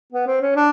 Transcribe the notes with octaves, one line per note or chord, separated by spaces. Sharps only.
B3
C4
C#4
D4